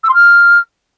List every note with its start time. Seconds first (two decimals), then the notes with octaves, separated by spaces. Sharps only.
0.04 E6
0.09 C6
0.14 F6